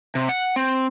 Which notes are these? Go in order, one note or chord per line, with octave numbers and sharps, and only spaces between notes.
C3
F#5
C4